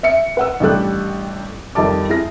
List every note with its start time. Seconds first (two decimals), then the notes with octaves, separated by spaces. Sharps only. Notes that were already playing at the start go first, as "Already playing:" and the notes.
0.03 E5 C#7
0.37 B4 F#5 E6
0.60 A1 D3 G3 G4 A4 F#6
1.75 F2 D#3 G3 A5 D6
2.09 E4 G#4 A#6